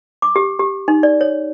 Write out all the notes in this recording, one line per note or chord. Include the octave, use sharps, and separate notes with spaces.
D6
G4
G4
D#4
D5
C#5